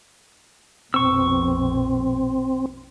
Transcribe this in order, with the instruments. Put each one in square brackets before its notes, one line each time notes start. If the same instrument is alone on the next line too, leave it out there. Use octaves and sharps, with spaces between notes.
[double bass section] A#1 F2 B2 [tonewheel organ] C4 [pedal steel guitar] C#6 E6